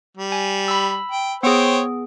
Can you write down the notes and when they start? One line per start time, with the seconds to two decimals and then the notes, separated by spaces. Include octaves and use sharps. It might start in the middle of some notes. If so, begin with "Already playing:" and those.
0.17 G3
0.32 G#5
0.68 B5 E6
1.11 G5
1.43 B3 G#4 C5 C#5 G5